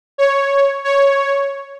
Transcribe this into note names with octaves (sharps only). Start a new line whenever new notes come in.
C#5
C#5